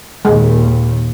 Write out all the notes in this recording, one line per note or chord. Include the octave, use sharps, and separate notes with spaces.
D#2 A#2 G#3